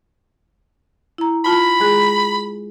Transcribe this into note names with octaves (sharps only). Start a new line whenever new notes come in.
E4 A#5
F4 A5 B5
G#3 G#4 F#6